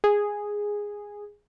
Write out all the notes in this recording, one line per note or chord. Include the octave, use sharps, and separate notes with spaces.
G#4